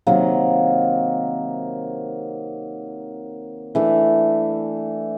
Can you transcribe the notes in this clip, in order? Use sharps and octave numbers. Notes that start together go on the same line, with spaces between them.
C3 D#3 F#3 A#3
E3 A3 D4